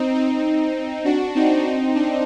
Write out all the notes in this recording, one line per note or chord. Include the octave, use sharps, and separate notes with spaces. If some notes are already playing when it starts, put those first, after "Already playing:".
Already playing: C4 D#4
C4 D#4
D4 F#4
C4 D#4
D4